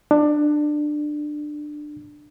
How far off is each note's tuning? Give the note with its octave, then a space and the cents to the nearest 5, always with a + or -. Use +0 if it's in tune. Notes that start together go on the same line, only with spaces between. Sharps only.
D4 +20